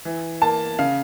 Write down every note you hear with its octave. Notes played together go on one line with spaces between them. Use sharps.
E3
A#3 A5
C#3 F5